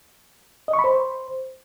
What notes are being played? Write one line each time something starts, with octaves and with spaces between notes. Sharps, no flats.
D#5
C#6
B5
C5